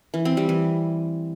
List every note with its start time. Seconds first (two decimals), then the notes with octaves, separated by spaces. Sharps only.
0.14 E3
0.25 C4
0.37 G3
0.49 E3